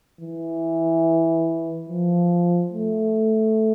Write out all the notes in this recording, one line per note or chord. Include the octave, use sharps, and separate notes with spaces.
E3
F3
A3